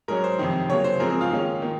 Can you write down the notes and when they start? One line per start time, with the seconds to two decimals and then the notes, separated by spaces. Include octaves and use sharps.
0.08 G#2 F#3 C#4 A#4
0.24 C5
0.39 F2 C3 D#3
0.69 C#3 F#3 A#3 C#5
0.84 C5
1.00 G#2 F3 C4 A#4
1.10 G#4
1.21 F4
1.30 G#2 D#3 A#3 C#4
1.62 D#3 A#3